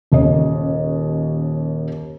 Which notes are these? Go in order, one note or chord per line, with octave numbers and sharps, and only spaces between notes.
D#1 D#2 C#4 D#5